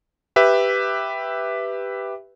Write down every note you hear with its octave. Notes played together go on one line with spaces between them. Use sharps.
G4 B4 E5